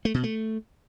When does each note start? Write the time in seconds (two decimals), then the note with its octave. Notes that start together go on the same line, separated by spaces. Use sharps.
0.05 A3
0.14 B2
0.23 A3